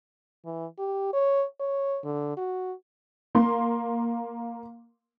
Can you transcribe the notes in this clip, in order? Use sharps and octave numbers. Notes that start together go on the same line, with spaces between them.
E3
G4
C#5
C#5
D3
F#4
A#3 C6